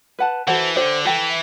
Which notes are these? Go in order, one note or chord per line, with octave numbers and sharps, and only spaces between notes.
B4 F#5 A5
E3 F#4 A4 C5 F#5
D3 G4 C5 F#5
E3 A4 E5 G5